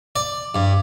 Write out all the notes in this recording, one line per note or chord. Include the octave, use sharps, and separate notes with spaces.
D5
G2